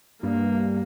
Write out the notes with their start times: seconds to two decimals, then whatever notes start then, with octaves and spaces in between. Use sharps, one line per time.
0.23 G2 A#3